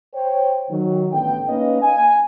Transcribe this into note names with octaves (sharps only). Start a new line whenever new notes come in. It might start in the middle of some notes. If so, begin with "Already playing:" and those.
C5 C#5 G5
D#3 F#3
A1 A2 D3 B3 G5
A#3 C#4 D#4 B4 D#5 F5
G#5